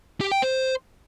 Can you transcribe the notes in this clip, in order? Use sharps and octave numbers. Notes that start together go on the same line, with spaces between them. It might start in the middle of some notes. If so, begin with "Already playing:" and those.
G4
G5
C5